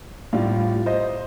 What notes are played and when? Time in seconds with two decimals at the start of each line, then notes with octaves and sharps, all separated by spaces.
0.33 A2 G3 D4 F4 D5 F5
0.86 C5 D#5